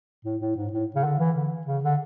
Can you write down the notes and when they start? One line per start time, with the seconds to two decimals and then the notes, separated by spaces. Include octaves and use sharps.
0.25 A2
0.41 A2
0.56 G#2
0.73 A2
0.95 C#3
1.04 D3
1.19 E3
1.36 D3
1.67 C#3
1.84 D3